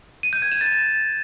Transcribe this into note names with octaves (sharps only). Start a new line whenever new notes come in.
D#7
G6
G#6
E7
A6